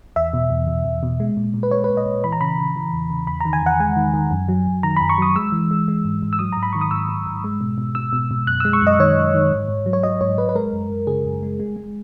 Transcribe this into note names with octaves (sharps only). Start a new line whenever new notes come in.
E2 E5
B2
E2
B2
E2
B2
G#3
A#2
A#2
B4
G#3 C#5
B4
A#2
D#5
A#2
E3 B5
A#5
C#3 B5
C#3
E3
E2
C#3
E2 B5
D#3 A#5
G#5
E2 F#5
G#3 G#5
D#3
D#3
F#2
F#3
F#2
D#3 A#5
F#2 B5
C#6
F#3 D#6
G#3 E6
E3
G#3
G#3
G#2
G#2
E6
F#3 D#6
G#2 A#5
B5
D#3 C#6
D#6
G#2 E6
G#2
G#2
G#3
B2
B2
B2 E6
B2
B2
F#2 F#6
G#3 E6
C#6
F#2 D#5
D#3 C#5
F#2
D#3
G#2
G#2
F#3
C#5
F#3 D#5
G#2 C#5
G#2 B4
B4
G#3 A#4
F#2
F#2
C#3 G#4
F#2
G#3
G#3
G#3